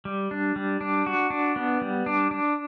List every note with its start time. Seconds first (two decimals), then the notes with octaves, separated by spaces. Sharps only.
0.05 G3
0.31 D4
0.56 G3
0.81 D4
1.06 F#4
1.30 D4
1.56 B3
1.81 G3
2.06 D4
2.31 D4